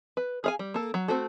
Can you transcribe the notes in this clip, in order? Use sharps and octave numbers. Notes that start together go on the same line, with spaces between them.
B4
G#4 F5 G#5
G3
A#3 A4
F#3
A3 C4 F#4 A4